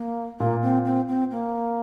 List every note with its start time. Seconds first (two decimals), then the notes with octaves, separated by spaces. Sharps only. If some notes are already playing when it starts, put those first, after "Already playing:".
Already playing: A#3
0.40 A#2 A#3
0.63 C4
0.85 C4
1.08 C4
1.31 A#3